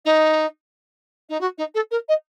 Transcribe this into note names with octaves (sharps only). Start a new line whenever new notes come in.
D#4
D#4
F#4
D#4
A4
A#4
D#5